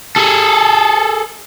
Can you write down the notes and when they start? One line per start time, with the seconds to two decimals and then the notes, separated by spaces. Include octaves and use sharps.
0.16 G#4 A4